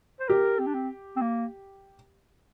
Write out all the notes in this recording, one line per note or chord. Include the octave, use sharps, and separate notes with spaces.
C5
G4 A#4
C4
D4
C4
C4
A#3